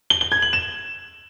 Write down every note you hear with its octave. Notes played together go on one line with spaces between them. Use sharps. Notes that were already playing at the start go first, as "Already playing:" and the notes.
G7
G7
G#6
F#7
E7